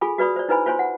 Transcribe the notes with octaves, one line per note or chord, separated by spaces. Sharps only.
F4 G#4 A4 G#5 B5
F#4 B4 D5 B5 D#6
C5 D5
D#4 E4 B4 C5 G#5 B5
F4 C5 C#5 G#5 C6
F#5